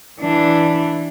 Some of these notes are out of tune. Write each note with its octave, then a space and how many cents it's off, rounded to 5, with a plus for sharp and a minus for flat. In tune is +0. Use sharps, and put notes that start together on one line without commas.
E3 +0 D4 +0